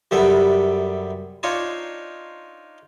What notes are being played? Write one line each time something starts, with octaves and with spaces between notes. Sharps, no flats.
F#2 C3 G3 B3 A4 D5
D4 D#4 F4 C5 C#5